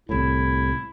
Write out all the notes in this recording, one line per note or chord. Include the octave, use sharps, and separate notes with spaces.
C2 A2 E4